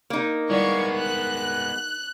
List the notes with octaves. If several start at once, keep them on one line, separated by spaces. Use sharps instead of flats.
A#3 D#4
G3 G#3 B3 E4 F5 C#6
F#6